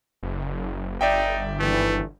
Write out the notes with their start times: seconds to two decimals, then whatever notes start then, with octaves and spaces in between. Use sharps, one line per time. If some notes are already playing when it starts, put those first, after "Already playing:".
0.23 F#1
1.01 G1 D#4 D5 E5 G5
1.59 G#1 D3 E3 A3